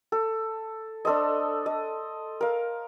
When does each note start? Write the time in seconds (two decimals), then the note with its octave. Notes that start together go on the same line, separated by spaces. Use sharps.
0.12 A4
1.05 D4 A4 C5 D#5
1.66 D#5
2.41 A#4 F5